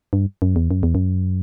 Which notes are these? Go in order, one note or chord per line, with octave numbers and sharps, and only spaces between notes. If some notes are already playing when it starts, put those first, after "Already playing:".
G2
F#2
E2
F#2
E2
F#2